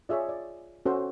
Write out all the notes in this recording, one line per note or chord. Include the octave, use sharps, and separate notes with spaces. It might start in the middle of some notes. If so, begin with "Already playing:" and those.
F4 G#4 C#5 D5 E5
D5
C#4 F#4 A4 C5